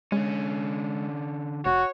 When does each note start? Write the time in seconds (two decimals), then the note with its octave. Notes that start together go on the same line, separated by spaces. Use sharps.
0.12 D3 G#3 C#4
1.65 F1 F#4 C#5